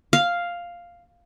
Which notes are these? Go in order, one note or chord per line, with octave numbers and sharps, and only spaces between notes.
F5